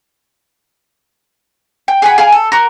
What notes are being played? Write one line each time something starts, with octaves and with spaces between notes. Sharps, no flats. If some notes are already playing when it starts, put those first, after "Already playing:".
G5
G#4 F#5 B5
G#4 F5
A4
F#4 A#4